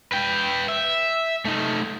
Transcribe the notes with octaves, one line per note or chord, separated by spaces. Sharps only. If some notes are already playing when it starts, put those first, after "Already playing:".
B4 G5
E5
A3 D#4